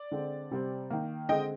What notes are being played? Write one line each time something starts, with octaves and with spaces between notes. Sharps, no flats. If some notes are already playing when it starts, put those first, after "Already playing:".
Already playing: D5
D3 G#3 C4
C3 G3 C4
D#3 A#3
D3 G#3 C4 D#5 G5